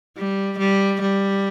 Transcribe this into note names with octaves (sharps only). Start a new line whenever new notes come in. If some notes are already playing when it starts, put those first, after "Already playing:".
G3
G3
G3